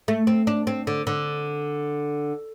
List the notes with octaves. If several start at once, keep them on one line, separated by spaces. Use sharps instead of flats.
A3
C4
D4
C4
D3
D3